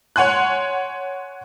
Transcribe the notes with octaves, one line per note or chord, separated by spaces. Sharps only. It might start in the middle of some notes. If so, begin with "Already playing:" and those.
C#5 F#5 G#5 C6 F#6